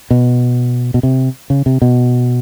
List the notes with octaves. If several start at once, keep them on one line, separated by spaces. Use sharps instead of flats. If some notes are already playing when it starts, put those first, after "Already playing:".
B2
B2
C3
C#3
C3
B2